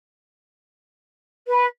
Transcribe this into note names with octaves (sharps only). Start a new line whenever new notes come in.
B4